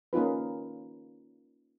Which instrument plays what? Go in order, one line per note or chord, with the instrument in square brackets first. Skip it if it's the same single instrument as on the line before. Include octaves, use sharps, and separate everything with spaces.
[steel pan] A#3 C#4 D#4 F4 B4